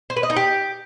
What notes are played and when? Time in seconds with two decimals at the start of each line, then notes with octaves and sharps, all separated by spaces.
0.10 C5
0.17 B4
0.23 D#5
0.30 D#4
0.36 G4